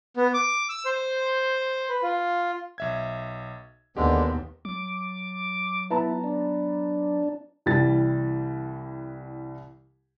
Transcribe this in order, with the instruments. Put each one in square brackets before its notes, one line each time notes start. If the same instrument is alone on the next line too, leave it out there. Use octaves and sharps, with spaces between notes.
[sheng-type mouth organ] B3
D6
E6
C5
B4
F4
[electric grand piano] B1 E5 G#6
[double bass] D#2 [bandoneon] D3 G#3 [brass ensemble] B3 [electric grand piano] G4
[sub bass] F#3 [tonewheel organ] D6
[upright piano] B3 A5 A#5 [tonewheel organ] E4
[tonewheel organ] D4
[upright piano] C2 E3 G3 A6